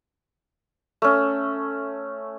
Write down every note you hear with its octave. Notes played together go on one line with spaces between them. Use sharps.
A3 C#4